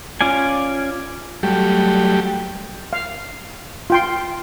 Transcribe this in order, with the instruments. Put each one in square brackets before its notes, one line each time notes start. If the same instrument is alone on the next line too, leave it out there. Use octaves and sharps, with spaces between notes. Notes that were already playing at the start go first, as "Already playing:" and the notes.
[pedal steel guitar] C#4 F4 D5 G#5
[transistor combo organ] F#3 G3 A3 G4
[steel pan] F5
F4 G5 C6